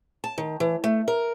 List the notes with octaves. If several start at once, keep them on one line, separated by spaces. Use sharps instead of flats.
A5
D#3
E3
A3
A#4